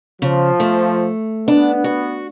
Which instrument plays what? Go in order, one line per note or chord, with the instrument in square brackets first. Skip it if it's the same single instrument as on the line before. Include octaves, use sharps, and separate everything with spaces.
[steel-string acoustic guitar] C#3 [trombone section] F3
[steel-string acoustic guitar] A3
[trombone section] B3 [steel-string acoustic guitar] D4
[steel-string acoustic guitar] F#4